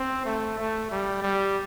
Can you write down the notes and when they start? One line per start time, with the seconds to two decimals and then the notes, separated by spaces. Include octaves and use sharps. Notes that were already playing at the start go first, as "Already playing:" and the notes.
Already playing: C4
0.25 A3
0.59 A3
0.91 G3
1.23 G3